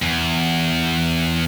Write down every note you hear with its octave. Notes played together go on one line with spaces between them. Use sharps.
E2